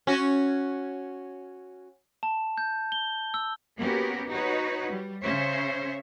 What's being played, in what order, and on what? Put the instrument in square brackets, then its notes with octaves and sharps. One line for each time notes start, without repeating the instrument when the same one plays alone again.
[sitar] C#4 F#4
[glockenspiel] A5
G6
G7
E6
[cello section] A#3 B3 C#4 F#4 G4 A#4
D#4 F#4 B4 C#5
G3
C#3 C#4 C5 C#5 E5